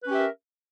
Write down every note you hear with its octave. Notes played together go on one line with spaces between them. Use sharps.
C#4 G4 A#4 B4 E5